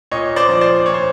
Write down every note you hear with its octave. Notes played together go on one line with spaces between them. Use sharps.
A#2 C#5 D#5
C5 D5
F3
C5 D5
A#2 C#5
C5